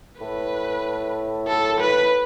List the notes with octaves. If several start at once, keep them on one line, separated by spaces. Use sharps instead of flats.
A2 B4
A4
B4